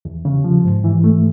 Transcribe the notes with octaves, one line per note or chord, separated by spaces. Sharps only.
E2
C#3
F3
G#2
E3
A3